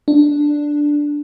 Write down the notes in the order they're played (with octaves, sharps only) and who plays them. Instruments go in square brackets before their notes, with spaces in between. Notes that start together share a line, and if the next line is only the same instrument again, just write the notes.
[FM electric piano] D4